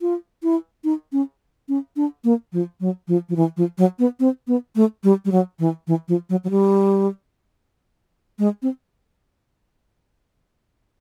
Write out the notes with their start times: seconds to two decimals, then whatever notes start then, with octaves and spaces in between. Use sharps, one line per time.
0.01 F4
0.43 E4
0.84 D#4
1.12 C#4
1.69 C#4
1.96 D4
2.24 A#3
2.53 F3
2.80 F#3
3.08 F3
3.29 F3
3.36 E3
3.57 F3
3.78 F#3
3.99 B3
4.20 C4
4.48 B3
4.76 A3
5.04 G3
5.25 G3
5.32 F#3
5.59 E3
5.87 E3
6.08 F3
6.30 F#3
6.44 F#3
6.50 G3
8.39 G#3
8.62 C4